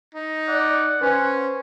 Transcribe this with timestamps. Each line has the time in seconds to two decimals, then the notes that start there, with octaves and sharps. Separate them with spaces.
0.14 D#4
0.48 D5 F#5
1.01 C#4 B4 C5 G#5